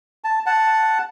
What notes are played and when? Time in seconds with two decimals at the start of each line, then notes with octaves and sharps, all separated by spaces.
0.24 A5
0.46 F#5 A5